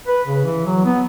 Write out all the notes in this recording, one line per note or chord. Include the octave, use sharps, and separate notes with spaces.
B4
C#3
E3
F#3
B3